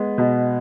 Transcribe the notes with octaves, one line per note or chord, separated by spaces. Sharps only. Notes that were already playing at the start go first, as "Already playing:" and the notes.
Already playing: G#3 B3
B2